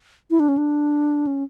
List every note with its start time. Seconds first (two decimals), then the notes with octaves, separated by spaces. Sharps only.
0.31 E4
0.40 D4
0.48 C#4
0.57 D4
1.27 C#4